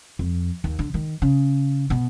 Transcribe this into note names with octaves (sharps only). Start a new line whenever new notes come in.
F2
D#2
D3
D#3
C#3
B2